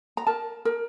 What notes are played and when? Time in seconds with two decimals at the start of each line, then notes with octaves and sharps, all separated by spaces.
0.17 A#5
0.27 A#4 A5
0.65 A#4